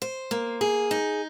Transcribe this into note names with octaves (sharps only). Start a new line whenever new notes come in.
C5
A#3
G#4
D#4